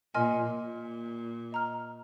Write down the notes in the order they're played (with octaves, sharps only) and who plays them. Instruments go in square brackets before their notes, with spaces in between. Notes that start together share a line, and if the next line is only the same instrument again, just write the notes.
[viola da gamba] A#2 [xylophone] A#4 D#5 G#5 C6 F6
[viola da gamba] A#2
[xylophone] D#5 A#5 F6